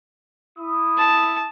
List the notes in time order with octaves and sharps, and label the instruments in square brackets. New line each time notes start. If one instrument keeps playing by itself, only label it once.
[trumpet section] E4 D#6
[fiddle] A5